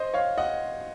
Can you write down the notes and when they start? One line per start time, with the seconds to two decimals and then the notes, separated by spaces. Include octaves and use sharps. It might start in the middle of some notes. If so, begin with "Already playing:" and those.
Already playing: C5 D#5
0.14 C#5 F5
0.38 D#5 F#5